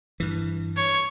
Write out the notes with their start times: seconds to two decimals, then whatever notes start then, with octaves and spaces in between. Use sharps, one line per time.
0.20 G2 E3
0.76 C#5